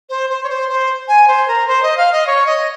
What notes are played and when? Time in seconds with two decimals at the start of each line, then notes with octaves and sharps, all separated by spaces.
0.09 C5
0.30 C5
0.43 C#5
0.49 C5
0.69 C5
1.08 G#5
1.28 C5
1.48 A#4
1.67 C5
1.83 D#5
1.97 F5
2.12 D#5
2.27 C#5
2.46 D#5